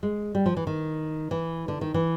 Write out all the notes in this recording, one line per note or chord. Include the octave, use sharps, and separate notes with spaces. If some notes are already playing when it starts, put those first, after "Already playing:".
G#3
G3
F3
E3
D#3
E3
D3
D#3
E3